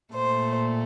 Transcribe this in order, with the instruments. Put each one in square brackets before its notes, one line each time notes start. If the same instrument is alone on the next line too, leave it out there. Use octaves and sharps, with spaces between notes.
[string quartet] A#2 A3 C5